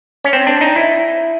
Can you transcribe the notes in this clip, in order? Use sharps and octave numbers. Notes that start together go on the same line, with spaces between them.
C#4
C4
D4
D#4
E4